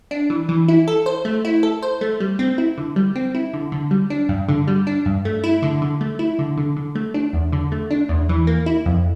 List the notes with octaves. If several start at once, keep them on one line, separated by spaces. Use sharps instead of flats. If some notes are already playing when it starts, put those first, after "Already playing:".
D4
E3
E3
E4
A4
C5
A3
E4
A4
C5
A3
G3
C4
E4
D3
G3
C4
E4
D3
D3
G3
D4
G2
D3
G3
D4
G2
A3
E4
D3
D3
A3
E4
D3
D3
D3
A3
D4
E2
D3
A3
D4
E2
E3
A#3
E4
F2